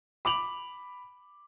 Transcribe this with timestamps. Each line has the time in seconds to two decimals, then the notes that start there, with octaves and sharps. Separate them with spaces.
0.25 B5 D6 F7 F#7